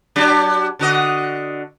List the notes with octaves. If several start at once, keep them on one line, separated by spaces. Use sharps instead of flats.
F#3 D4 G4
D3 F#4 D#5